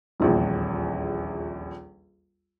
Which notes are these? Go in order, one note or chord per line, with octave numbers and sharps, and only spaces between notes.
D#1 A#1 E2